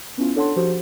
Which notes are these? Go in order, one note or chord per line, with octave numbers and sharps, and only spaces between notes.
B3 C#4 E4 F4
D4 A4 C#5 F#5 A5 C6
F3 F#4 G4 C5